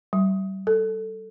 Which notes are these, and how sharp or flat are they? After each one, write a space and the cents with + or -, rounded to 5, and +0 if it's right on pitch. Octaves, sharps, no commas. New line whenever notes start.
G3 -35
A4 +5